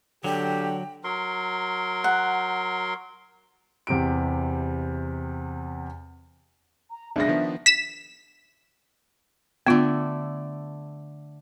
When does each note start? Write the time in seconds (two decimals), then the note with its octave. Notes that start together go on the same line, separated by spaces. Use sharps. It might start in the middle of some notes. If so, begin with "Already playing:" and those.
0.24 D3 F#3 G4 G5
1.04 F#3 A#4 C6
2.04 F#5
3.87 E2 C3 G4 D7
6.91 A#5
7.16 B1 C#3 G#3 D4 E5 A#6
7.28 D#3 F3 B3
7.66 B6 E7
9.67 D3 A3 B3 F4